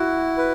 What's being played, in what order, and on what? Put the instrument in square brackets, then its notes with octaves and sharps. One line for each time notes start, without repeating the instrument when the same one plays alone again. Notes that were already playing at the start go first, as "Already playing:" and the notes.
Already playing: [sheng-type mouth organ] E4 [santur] F#4
[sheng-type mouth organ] B4